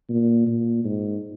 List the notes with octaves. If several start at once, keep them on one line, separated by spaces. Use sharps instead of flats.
A#2
A#2
G#2